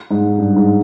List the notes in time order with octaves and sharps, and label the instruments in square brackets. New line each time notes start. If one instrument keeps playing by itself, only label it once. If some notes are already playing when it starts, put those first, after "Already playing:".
[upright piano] G#2
G2
G#2